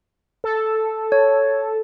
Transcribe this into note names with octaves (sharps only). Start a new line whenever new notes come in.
A4
C#5